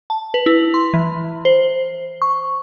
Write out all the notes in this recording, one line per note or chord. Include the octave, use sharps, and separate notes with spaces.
A5
B4
E4
C6
E3
C5
C#6